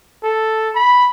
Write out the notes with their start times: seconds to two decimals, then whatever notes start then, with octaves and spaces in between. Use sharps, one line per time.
0.24 A4
0.75 B5